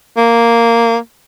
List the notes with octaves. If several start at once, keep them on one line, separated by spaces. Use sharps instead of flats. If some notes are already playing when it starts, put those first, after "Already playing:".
A#3